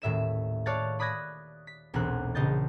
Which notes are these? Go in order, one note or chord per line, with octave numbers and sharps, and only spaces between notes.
D#1 A2 E5 E7
C#5 D5 F5 A5 F#6 A6
D5 B5 D#6 F#6 G#6 A#6
B6
E1 B1 A#2 C4 F#6
A#1 C#3 D#5 G6 A6